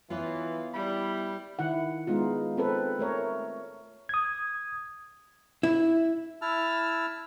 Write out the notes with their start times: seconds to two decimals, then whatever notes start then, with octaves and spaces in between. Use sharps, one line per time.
0.10 E3 B3 F4 B4 C#5
0.74 G3 E4 B5
1.59 D#3 E4 F#5
2.07 G#3 B3 D#4 F4
2.57 C4 A4 B4
2.99 A3 A#4 C#5
4.09 D#6 G#6
5.63 E4
6.42 E4 A5 E6 F6